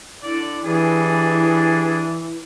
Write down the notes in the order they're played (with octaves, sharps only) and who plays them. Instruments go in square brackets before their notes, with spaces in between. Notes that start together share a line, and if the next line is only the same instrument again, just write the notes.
[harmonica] D3 D5 [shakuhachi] E4
[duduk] E3 [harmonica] G3 D4 G#4